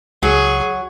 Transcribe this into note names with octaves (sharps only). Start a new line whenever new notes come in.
C#2 F#3 G#4